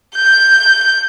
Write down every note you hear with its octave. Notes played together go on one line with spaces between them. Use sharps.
G6